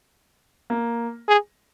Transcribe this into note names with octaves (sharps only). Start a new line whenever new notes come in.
A#3
G#4